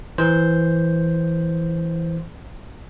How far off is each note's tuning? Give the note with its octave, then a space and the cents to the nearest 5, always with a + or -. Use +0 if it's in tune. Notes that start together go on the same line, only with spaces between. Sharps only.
E3 +0 C5 +0